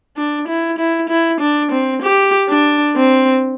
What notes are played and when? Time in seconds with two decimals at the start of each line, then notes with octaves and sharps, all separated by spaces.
0.17 D4
0.48 E4
0.78 E4
1.09 E4
1.41 D4
1.72 C4
2.02 G4
2.49 D4
2.96 C4